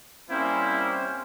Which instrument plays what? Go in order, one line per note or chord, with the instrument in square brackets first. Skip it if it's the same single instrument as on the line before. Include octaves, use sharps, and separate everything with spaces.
[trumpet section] G3 A#3 E4 [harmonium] C4 C#4 C5